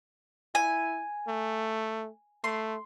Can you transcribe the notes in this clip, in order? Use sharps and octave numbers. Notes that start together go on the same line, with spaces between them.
E4 G#5
A3
A3 C6